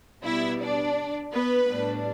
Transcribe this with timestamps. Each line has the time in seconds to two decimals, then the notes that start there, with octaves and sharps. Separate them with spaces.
0.23 B2 G3 B3 E4 E5
0.60 D4 D5
1.33 B3 B4
1.70 A2 G3 B3 D4